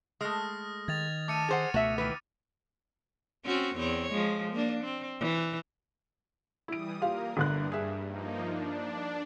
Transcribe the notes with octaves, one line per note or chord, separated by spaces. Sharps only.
G#3 A3 D#6 F6 A#6
D#3 G#6 A6 F7
A3 D6 C#7 D#7
G#4 C5 F#5
C#2 B2 A3 F#4 E5
D#3 E3 B4
C4 C#4 F#4
E2 C4 C#5
F3 G#3
A#3 D4
C4
E3
E3 G3 E4 D#6 D7
A#3 F4 G4 A#4 F5
G1 G2 D3 F#6
G#4 E5
F3 A#3 D#4
D4